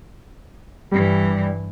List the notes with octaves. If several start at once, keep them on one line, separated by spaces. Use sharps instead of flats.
G2 E3 G3